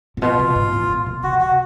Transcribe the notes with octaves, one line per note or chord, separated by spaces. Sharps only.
A#2
B2 F4
B2
G#2
A2
A#2
B2
C3 F#4
C3 F#4